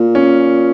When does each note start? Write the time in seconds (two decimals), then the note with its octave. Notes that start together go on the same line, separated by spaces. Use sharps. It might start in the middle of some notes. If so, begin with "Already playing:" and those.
Already playing: A#2
0.15 C#4